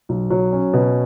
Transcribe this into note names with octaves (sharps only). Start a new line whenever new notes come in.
B1
F#3
C#4
B2